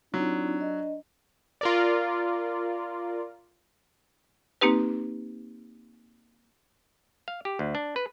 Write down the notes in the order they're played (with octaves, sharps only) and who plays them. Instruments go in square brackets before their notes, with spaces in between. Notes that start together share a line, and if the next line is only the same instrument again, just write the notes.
[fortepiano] F#3 [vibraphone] C4 D#4 F4 [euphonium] D4
[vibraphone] D#5
[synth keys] F4 A#4 D5
[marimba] A#3 C4 D#4 G4 B4
[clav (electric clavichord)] F5
G4
D2
D4
B4